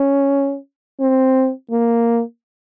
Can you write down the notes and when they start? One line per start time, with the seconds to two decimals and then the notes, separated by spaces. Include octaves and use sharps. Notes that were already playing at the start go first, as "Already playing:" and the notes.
Already playing: C#4
1.01 C4
1.71 A#3